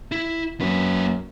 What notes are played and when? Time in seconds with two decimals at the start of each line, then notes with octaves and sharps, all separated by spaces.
0.12 E4
0.60 F#2 A#3 B4